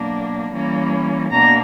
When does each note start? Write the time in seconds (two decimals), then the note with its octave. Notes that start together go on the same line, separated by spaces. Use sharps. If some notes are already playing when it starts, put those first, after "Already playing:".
Already playing: B2 F#3 A#3 D4
0.51 E3 G3 A#3 C#4
1.32 B2 A#3 D4 A#5